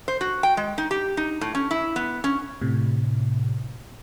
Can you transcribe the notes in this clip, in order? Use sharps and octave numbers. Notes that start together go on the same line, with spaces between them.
C5
F#4
G5
G#3
D#4
G4
D#4
A2
C#4
E4
B3
C#4
A2 C3